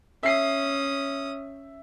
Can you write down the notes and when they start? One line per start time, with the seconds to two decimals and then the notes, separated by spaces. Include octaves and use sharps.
0.23 C#4 E5 D#6 C7